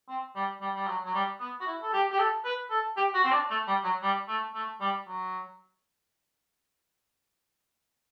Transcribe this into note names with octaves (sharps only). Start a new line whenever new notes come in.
C4
G3
G3
G3
F#3
F#3
G3
B3
F#4
E4
A4
G4
G4
A4
B4
A4
G4
F#4
C4
D4
A3
G3
F#3
G3
A3
A3
G3
F#3